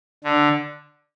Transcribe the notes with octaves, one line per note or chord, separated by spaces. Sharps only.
D3